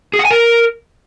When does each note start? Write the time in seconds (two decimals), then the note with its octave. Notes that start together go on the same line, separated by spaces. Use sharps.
0.14 G#4
0.19 F#5
0.25 G#5
0.31 A#4